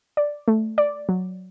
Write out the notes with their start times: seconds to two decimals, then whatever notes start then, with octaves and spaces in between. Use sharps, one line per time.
0.17 D5
0.48 A3
0.78 D5
1.09 F#3